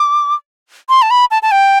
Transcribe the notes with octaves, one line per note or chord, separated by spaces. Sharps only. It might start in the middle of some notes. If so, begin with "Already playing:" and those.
Already playing: D6
C6
A5
B5
A5
A5
G5